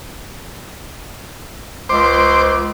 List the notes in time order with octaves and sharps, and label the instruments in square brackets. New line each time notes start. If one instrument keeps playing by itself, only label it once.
[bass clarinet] C#2 [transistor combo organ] C5 D6